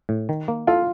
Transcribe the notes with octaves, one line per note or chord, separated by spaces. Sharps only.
A2
D#3
A#3
F4 A4